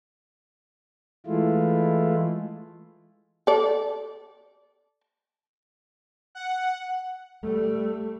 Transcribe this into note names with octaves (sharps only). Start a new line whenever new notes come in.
E3 G#3 A3 E4 F4
A4 D5
F#5
G3 A3